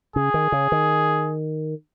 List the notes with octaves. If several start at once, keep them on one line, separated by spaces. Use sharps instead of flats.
C#3 G#4
D#3
C#3
D#3